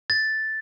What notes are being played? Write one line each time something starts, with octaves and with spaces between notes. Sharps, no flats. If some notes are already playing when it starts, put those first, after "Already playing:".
A6